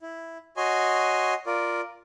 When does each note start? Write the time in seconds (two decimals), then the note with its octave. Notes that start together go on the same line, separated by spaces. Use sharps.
0.01 E4
0.57 F#4 C#5 D#5 G#5 C6
1.46 F4 A#4 D5